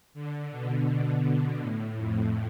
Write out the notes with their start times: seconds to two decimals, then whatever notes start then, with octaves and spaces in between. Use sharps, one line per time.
0.14 D3
0.51 B2
1.61 A2
1.97 F2